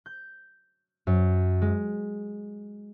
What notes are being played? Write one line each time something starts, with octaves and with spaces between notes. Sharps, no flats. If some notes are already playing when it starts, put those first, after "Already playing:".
G6
F#2
G#3